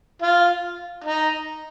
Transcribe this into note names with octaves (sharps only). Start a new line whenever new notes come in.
F4
D#4